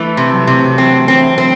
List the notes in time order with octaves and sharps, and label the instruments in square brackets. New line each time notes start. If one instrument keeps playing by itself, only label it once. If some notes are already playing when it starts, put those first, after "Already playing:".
Already playing: [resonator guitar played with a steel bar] E3 [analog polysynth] A3
[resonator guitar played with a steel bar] C3
[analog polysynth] F#3
[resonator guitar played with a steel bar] C3
[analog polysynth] E3 [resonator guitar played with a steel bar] C4
[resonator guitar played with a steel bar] C4
C4